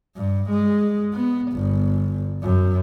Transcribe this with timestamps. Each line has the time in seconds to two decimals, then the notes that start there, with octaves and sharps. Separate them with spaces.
0.16 G2
0.49 G#3
1.13 B3
1.52 G1
2.42 F#2